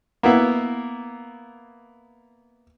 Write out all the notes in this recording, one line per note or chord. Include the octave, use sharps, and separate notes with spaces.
A#3 B3 E4